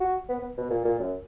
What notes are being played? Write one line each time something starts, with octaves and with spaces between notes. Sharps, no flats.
F#4
B3
B3
B2
A#2
A#2
F#2